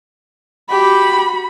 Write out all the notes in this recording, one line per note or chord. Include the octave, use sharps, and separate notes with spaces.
F#4 G4 B5